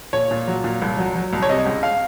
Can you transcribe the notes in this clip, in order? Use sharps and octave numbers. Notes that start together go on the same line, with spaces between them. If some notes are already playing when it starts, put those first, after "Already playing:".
A#2 C#5
A#2
F#3
A#2
C2
F#3
F#3
C2
C#5
C3 D#5
C#2
F5